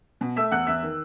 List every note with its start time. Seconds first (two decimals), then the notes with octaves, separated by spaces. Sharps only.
0.21 B2
0.36 A3 E5 E6
0.52 E2 F#5 F#6
0.67 E2 E5 E6
0.83 D#3